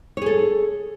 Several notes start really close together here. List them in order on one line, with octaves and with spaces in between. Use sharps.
C#5 G#4 A4